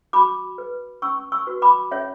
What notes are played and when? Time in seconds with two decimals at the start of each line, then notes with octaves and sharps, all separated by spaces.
0.13 F#4 B5 D6
0.58 B4
1.02 C#4 C#6 E6
1.32 C#6 E6
1.47 F#4 B4
1.62 B5 D6
1.91 C#4 C#5 E5